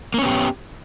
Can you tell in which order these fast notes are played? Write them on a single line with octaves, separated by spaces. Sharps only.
A#3 C#4 B3 G4